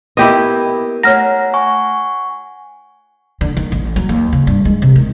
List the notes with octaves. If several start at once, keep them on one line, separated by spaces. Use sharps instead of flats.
A#3 B3 E4 G4 A#4 D#5
A3 C#5 F#5 A#5 F6 A#6
F#5 G#5 C#6
D3
D#3
A1
F#3
D#2
C#3
G2
G#3
C3
D#3